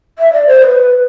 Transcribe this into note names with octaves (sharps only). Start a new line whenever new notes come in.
E5
D5
C5
C5
B4